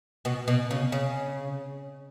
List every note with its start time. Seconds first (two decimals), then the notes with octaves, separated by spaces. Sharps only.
0.25 B2 B3
0.48 B2
0.71 C#3
0.92 C#3